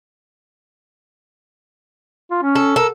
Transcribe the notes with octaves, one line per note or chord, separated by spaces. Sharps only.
F4
C#4
A4
A4 A#4